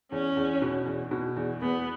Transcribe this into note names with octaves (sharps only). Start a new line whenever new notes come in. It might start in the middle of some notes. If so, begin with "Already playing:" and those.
E2 C#4
E2
B2
E2
B2
E2
E2 B3